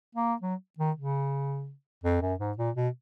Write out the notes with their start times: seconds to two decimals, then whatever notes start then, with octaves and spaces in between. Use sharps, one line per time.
0.15 A#3
0.42 F#3
0.79 D#3
0.96 C#3
2.04 F2
2.21 F#2
2.39 G#2
2.57 A#2
2.76 B2